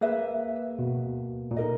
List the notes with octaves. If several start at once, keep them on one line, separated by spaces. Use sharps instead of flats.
A#3 G#4 B4 E5
B2
A#2
D#4 A#4 D#5